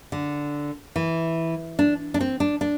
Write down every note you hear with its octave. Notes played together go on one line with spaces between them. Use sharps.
D3
E3
D4
D4
C4
D4
D4